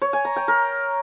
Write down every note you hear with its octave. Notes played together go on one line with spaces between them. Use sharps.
C#5
G#5
A#5
G5
A#4